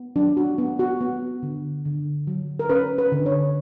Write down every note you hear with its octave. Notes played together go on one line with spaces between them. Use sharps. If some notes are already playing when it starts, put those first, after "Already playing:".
Already playing: B3
F#3 D4
F#4
B3
F#4
B3
D3
D3
F#3
A#4
C#4 B4
B4
D3
C#5